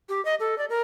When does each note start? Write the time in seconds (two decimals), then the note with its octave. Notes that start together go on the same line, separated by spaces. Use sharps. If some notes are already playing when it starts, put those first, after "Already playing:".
0.09 G4
0.25 D#5
0.40 A4
0.58 D5
0.70 A#4